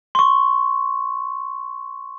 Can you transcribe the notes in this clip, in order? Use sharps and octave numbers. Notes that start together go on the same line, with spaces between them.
C6 C#6